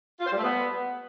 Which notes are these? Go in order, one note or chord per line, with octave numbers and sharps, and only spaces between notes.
F4
C5
G3
A3
B3